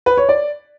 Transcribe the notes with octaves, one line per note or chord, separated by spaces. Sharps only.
B4
C#5
D5